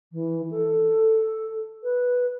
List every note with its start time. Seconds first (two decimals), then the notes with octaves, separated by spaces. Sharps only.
0.12 E3
0.51 A4
1.83 B4